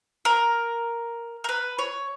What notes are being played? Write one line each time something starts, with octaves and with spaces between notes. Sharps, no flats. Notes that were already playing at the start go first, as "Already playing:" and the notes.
A#4
A#4
B4
C#5